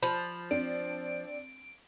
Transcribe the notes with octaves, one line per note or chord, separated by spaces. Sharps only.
F3 B5
C4 D4 D7